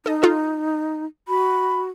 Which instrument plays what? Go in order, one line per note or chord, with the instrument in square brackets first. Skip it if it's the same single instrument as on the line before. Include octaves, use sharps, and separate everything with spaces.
[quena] D#4 [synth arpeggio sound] A4 D#5
[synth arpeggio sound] F4 A4 D#5
[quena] F#4 [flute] B5